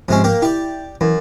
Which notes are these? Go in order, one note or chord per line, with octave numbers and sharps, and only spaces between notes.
G#2 C3 F3 G#3 C#4
A#3 G4
E4 G4 D5
F#2 E3